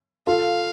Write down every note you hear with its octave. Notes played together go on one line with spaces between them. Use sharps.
F4 A4 F5